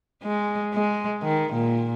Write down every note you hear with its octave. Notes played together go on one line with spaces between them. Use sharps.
G#3
G#3
D#3
A#2